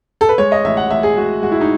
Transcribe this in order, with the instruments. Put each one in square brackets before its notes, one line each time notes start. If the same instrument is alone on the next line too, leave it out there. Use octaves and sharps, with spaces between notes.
[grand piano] A4
B4
G#3 C#5
D#5
A1 E5
F#5
A1 E5
G#4
G#3 F#4
G#3 F#4
E4
D#4